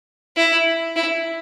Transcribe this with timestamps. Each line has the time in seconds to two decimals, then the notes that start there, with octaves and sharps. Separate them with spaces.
0.36 E4
0.96 E4